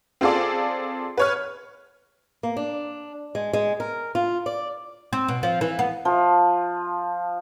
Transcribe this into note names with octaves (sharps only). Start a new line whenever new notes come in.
C4 F4 G#4 A4 D5
B4 C#5 F6
A#3
D4
G#3
G#3
A#4
F4
D5
C4
B2
F3
E3
B3
F3